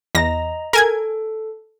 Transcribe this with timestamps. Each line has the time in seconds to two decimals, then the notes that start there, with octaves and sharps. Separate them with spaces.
0.15 E2 D#5 A#5 A#6
0.73 A4 A#4 G#5 G#6